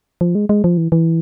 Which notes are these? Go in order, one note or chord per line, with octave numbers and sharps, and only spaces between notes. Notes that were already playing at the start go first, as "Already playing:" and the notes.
F3
G#3
G#3
F3
E3
E3